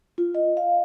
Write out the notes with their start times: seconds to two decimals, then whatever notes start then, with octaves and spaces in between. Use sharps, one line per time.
0.18 F4
0.35 D#5
0.57 F5